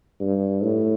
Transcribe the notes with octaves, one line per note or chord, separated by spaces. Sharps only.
G2
A2